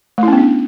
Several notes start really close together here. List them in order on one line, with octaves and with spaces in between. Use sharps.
A3 E4 C#4 B3 D4